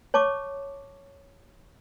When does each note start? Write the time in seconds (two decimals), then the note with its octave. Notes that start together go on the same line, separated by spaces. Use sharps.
0.14 C#5 A5 C#6 D6